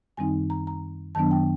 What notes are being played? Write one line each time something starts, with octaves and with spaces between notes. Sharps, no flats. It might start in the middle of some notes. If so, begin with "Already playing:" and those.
F#2 D#3 G3 C4 D#4 G#5
A#5
A#5
F#2 D#3 F#3 B3 D4 A5
G5